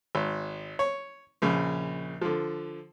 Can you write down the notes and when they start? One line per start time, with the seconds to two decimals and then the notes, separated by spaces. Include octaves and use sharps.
0.15 G#1
0.79 C#5
1.42 A#1 C#3
2.22 D3 F3